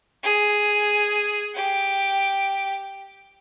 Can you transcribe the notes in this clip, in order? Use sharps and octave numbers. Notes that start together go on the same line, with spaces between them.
G#4
G4